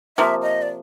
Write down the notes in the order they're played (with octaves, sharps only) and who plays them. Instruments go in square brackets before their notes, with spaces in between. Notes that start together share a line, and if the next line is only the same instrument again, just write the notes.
[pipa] C3 F3 A#3 [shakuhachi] E5
[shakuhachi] D#5
D5